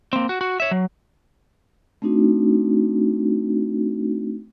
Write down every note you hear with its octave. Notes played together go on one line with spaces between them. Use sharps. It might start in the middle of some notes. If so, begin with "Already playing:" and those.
A#3 C4
F#4
F#4
C#5 E5
F#3
A3 C4 D4 D#4 F#4